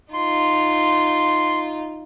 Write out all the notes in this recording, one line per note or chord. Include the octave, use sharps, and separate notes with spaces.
D#4 F4 C6